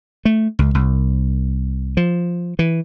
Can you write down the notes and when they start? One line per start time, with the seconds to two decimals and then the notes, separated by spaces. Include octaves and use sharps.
0.25 A3
0.59 C#2
0.75 C2
1.97 F3
2.59 E3